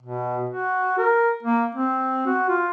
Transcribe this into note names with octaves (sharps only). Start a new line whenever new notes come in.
B2
F#4
A#4
A#3
C4
F#4
F4